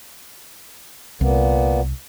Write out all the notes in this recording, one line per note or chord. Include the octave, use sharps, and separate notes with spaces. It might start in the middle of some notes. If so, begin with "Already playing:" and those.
C2 A#2 A#3 B3